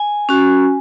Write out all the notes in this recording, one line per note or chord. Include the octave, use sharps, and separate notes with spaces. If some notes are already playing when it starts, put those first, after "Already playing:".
Already playing: G#5
C#4 F#4